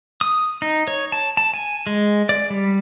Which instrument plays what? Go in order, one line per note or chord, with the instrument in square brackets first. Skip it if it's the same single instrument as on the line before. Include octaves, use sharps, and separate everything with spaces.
[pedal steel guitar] D#6
D#4
C#5
A5
A5
G#5
G#3
D5
G3